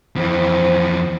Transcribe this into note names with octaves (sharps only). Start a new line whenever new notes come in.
F2 E3 C5